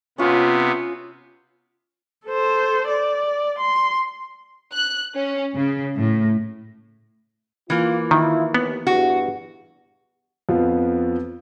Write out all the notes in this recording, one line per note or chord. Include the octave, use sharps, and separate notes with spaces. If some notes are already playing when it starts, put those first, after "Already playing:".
C3 B3 C#4 F4
A4 C5
D5
C6
F#6
C#4
C#3
A2
E3 A#3 F4
D#3 E4 F4
D#2 B3
E2 G2 F#4
F2 F3 B3 F4